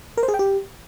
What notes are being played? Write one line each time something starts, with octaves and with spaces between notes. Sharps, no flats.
A#4
C5
G#4
G5
G4